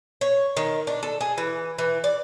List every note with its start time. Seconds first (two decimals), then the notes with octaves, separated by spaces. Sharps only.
0.21 C#5
0.57 D#3
0.87 D4
1.03 A4
1.21 G#4
1.38 E3
1.78 E3
2.04 D5